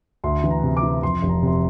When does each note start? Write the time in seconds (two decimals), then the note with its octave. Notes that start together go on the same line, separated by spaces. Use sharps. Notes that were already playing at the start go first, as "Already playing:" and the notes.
0.24 D2 C6
0.44 E3
0.51 A#5
0.63 C3
0.77 D6
0.83 E3
1.03 F2 C6
1.23 F1
1.29 A#5
1.43 C3 C6